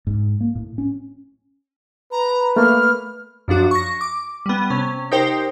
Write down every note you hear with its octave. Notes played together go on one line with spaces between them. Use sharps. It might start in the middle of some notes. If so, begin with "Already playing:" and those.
G#2
A#3
A2
C#4
B4 A#5
A3 A#3 F6
F#2 F3 D4 F#4
C#6 A#6
D6
G3 B3
C3 C#4
D#4 G4 A#4 C5 G5